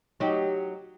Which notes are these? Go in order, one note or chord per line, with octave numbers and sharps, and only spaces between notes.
F#3 D#4 G4